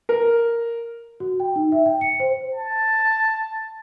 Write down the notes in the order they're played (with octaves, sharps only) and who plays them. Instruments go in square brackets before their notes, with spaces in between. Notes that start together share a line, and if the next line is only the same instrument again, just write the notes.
[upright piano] A#4
[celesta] F#4
G5
D#4
E5
G5
C#7
C5
[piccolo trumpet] A5